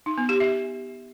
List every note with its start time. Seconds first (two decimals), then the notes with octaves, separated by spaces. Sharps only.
0.06 D#4
0.18 B3
0.29 G4
0.40 E5